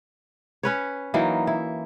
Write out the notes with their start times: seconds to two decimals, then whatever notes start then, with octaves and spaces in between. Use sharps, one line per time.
0.63 C#4 B4 C#5
1.14 E3 F#3 A#3 D#4
1.47 E4